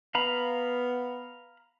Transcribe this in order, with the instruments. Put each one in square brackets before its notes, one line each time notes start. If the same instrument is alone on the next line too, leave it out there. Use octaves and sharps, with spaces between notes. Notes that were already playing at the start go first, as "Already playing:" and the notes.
[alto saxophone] B3 [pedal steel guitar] F5 A#5 B5